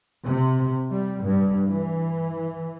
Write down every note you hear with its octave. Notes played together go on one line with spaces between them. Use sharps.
C3
G3
G2
E3